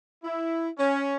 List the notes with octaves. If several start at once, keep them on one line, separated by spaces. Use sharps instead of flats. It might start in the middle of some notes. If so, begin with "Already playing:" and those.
E4
C#4